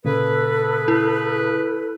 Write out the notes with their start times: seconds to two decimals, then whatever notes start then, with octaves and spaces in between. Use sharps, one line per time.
0.05 A#2 C#3 A#3 G#4 A4 B4
0.88 E4